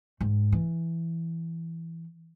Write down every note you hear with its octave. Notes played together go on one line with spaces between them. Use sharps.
G#2
E3